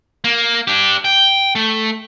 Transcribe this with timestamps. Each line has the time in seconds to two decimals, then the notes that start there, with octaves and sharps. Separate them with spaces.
0.24 A#3
0.67 D4 G4
1.05 G5
1.55 A3